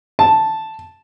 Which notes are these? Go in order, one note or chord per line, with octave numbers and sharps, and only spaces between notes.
A5